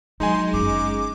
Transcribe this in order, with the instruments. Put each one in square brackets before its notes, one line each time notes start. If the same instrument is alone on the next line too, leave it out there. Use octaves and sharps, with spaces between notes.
[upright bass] F#3 [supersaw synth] G#3 [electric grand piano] D#4 G#5 [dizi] C6
[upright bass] G1 F#2 [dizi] D6